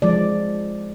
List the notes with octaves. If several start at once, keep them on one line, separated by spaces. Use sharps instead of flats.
F3 G#3 D5